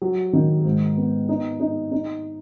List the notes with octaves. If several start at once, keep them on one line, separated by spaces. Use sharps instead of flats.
F#3
D#3
G#2
B3
D#4
D#4
D#4